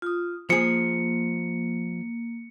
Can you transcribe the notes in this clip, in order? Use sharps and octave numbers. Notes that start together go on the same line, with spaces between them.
F4 D#6
F3 A#3 G#4 C#7